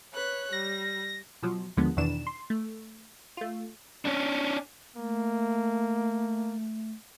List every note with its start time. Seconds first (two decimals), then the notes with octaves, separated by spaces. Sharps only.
0.14 B4 C#5 F#6
0.53 G3 A#6
1.43 B2 F3 F#3
1.77 D#2 D3 F3 G#3 B3
1.97 E2 B2 D#3 E3 D4 E7
2.27 C6
2.50 A3
3.37 A3 F4
4.05 C#4 D4
4.96 A3 A#3